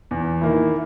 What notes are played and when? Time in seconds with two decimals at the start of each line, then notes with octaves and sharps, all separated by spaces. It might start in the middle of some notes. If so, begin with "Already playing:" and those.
0.11 E2
0.41 D#3 A#3 E4